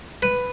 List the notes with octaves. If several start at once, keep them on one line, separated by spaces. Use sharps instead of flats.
B4